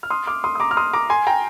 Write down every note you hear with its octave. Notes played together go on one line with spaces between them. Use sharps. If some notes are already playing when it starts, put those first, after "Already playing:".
F6
C6 D#6
D6 F6
C6 D#6
D#6
A#5 D6
F6
C6 D#6
A#5 D6
G#5 C6
G5 A#5